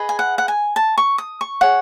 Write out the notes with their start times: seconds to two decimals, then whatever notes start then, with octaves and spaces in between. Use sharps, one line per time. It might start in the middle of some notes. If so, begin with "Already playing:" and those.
Already playing: G#4 B4 D#5
0.09 G#5
0.19 F#5
0.38 F#5
0.48 G#5
0.76 A5
0.98 C#6
1.18 D#6
1.41 C#6
1.61 G#4 C#5 F#5